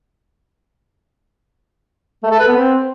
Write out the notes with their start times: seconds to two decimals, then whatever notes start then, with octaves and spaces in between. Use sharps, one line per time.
2.23 A3
2.31 A4
2.39 B4
2.48 B3
2.56 C4